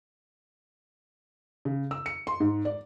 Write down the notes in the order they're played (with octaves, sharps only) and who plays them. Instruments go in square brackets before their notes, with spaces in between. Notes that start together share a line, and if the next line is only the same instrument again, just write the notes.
[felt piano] C#3
E6
C#7
C6
G#2
D5